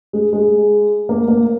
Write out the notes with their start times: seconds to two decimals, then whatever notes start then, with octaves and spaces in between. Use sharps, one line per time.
0.13 G#3
0.33 G#3
1.09 A#3
1.28 A#3